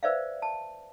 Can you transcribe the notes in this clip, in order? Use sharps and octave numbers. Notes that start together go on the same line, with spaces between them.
B4 C5 D5 E5 F5
A5